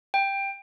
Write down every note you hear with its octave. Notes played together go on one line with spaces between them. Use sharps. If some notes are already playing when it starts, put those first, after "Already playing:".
G5